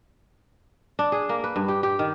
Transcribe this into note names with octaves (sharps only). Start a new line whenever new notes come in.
D4
G#4
A#3
B4
G2
G4
G4
D#3